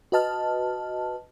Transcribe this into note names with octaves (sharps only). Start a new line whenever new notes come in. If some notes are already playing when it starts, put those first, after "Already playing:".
F#4 B4 D#5 A5 F6